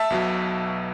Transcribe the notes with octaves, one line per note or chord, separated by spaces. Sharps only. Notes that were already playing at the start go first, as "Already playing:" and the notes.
Already playing: E5 A5
B1 B2 F#3